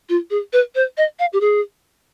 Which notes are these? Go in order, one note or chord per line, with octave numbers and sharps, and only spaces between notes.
F4
G#4
B4
C5
D#5
F5
G4
G#4